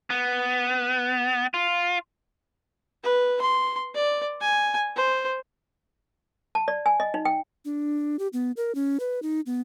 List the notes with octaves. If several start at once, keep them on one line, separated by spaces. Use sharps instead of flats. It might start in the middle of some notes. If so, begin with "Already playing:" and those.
B3
F4
B4
C6
D5
G#5
C5
A5
D5
G#5
D#5
D#4
G5
D4
G4
B3
A#4
C#4
B4
D#4
B3